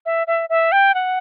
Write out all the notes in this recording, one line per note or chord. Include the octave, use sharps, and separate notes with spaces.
E5
E5
E5
G5
F#5